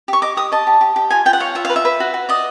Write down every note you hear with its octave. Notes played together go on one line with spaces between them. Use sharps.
G4 C#6
D#5 D6
G4 D#6
D#5 A5
G4
G4
G4
F4 G#5
F4 G5
F#5
C#5 F5
F4 E5
B4 F5
E5
B4
F#4
F#4
D5 D#5